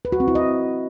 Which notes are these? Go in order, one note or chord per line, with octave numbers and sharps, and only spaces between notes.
B4
F#4
C4
E4
D#5